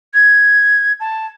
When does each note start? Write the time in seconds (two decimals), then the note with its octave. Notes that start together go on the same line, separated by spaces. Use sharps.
0.14 G#6
1.00 A5